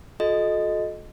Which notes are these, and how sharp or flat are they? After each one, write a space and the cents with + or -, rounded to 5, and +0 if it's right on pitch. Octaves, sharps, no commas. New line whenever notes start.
F#4 -45 A4 -30 D#5 +0